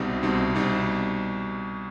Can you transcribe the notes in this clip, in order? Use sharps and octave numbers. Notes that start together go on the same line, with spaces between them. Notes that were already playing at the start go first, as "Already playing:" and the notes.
Already playing: C2 B2 G3 C4 D#4
C2 B2 G3 C4 D#4
C2 B2 G3 C4 D#4